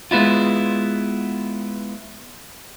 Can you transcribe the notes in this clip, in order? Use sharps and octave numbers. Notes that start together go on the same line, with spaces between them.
G#3 B3 E4 F4